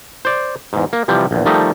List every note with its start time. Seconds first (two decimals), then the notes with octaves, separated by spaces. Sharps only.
0.25 C5 D5
0.73 E2 G#2
0.93 A#3
1.08 C3 E3 F3 G3
1.31 A#1 E2
1.45 D#3 F3 G3 A3 D#4 A4